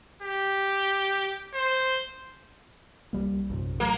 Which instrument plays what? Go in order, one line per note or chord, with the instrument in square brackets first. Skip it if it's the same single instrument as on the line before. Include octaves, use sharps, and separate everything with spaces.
[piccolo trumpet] G4
C5
[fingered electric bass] C2 G3 A#3
A#1 F#2 C3
[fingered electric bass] A2 F#3 A3 [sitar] A#3